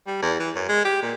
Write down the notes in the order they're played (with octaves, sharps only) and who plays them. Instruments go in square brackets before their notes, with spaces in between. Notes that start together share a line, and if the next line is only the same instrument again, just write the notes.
[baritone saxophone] G3
E2
E3
F#2
G#3
G4
A#2